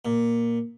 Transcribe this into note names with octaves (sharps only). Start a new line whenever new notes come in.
A#2